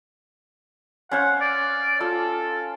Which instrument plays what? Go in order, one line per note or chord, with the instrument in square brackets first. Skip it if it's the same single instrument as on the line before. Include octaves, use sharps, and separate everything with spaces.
[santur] C#4 C5 F5 [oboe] F#5
[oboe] D5
[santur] F4 [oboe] A4